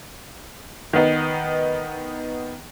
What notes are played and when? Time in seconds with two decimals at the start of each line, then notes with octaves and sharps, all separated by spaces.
0.93 D#3 B3 D#4